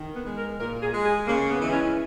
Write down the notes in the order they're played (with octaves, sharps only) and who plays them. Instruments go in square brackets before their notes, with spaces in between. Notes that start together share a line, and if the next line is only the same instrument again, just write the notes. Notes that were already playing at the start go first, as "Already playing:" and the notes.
Already playing: [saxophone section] D#3
B3
G#3
A#4
A#2 A#4
G#4
G#3
G#4
C#3 A#3
B3
E3 G#3
C#4